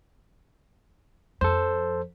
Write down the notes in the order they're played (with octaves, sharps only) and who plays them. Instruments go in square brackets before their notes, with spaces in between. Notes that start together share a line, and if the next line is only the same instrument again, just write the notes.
[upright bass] F2 [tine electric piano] A4 C5